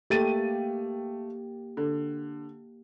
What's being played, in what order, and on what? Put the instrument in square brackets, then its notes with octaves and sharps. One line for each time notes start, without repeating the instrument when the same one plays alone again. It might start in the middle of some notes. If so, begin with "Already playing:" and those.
[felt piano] A3 A6 D#7 [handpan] A#3 G4
[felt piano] D3